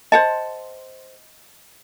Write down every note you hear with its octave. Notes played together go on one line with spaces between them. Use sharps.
C5 D#5 F#5 A5